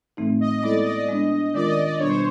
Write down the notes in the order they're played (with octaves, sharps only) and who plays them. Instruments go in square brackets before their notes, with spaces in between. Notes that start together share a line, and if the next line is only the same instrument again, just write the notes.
[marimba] A2 E3 A3 C4 D#4
[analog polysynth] D#5
D#5
[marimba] G#3 B3 E4 A4 [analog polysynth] D5
[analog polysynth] D#5
[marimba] G#3 B3 D4
[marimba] D#3 G#3 C#4 F4 A#4 [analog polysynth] D5
[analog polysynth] D#5
D5
[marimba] B2 G3 B3 D4 [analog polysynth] C#5
[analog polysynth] C5